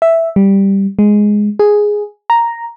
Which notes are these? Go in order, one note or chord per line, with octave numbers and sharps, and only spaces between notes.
E5
G3
G#3
G#4
A#5